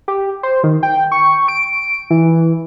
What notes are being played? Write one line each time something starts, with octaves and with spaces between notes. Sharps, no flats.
G4
C5
D#3
G5
C#6
D7
E3